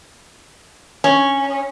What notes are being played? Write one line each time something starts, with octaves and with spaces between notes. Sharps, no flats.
C#4